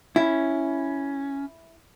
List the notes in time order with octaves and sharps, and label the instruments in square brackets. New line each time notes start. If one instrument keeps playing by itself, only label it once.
[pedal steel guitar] C#4 [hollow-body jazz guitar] E4